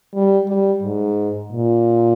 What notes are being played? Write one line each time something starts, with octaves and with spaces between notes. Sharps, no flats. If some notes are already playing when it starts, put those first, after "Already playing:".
G3
G3
G#2
A#2